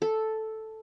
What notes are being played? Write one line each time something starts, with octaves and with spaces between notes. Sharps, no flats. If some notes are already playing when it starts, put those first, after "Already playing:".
A4